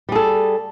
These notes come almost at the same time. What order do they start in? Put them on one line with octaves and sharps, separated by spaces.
G3 G#4 A4